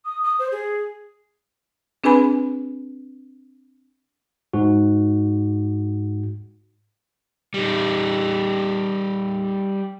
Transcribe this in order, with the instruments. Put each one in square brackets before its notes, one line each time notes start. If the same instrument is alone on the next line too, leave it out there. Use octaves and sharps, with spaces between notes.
[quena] D#6
D#6
C5
G#4
[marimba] C4 D4 G#4 B4 G#5 B5
[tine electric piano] G#2 F#4
[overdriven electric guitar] G3 D#4